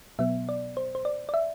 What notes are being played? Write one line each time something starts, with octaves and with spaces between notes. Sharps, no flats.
B2 F#3 B3 E5
D5
C5
C5
D5
D5
E5